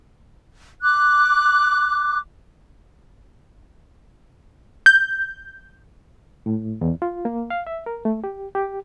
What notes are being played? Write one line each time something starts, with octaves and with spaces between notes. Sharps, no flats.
D6 F#6
G6
A2
E2
F4
A#3
F5
E5
A#4
A3
G4
G4